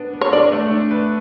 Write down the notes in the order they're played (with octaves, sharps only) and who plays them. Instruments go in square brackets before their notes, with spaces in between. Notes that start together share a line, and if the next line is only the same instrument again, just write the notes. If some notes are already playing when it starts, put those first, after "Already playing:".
Already playing: [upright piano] B3 D4
B3
[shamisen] C#5
[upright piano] D4 [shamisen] D5
[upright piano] A3
D4
B4